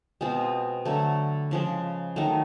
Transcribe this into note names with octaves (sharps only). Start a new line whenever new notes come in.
B2 G#3 C4 F4
D3 F#3 A3
C#3 F3 G#3
D#3 F#3 A3